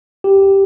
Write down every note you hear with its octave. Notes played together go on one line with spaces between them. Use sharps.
G4